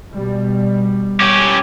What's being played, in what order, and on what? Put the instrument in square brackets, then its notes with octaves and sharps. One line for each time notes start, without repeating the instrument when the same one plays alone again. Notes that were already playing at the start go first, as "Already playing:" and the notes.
[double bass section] B2 G3
[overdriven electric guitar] C#4 G4